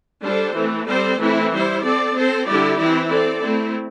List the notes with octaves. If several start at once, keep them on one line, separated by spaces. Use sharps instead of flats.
G3 D4 A4 C5
E3 A3 C4
G3 C4 A4 C5
E3 A3 C4 E4
G3 E4 C5
C4 A4 D5
C4 A4 C5
D3 G3 E4 G4 D5
E3 C4 E4
C4 A4 D5
A3 C4 E4